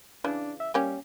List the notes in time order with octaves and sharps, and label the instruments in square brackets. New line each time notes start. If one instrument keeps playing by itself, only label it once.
[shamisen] C#3 E3 [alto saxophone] D4
[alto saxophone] E5
[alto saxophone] G3 [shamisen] A#3 C#4 G4